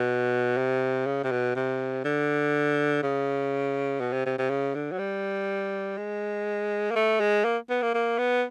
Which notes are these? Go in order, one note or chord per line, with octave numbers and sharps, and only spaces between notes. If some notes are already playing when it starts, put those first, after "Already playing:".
Already playing: B2
C3
C#3
C3
B2
C3
D3
C#3
B2
C3
C3
C3
C#3
D3
F#3
G3
G#3
A#3
A3
G#3
A#3
B3
A#3
A#3
B3